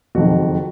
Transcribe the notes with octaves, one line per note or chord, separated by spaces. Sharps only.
F#1 F2 D#3 F#4